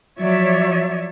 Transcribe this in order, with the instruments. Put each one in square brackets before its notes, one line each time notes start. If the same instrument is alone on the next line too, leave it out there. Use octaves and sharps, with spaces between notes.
[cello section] F3 F#3 C#5 D5 E5